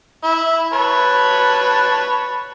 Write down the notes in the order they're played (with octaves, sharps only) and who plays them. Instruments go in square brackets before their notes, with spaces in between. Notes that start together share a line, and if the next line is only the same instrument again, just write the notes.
[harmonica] E4
B4 C#5 A5